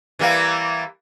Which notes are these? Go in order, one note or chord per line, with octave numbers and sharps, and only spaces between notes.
E3 G3 A#3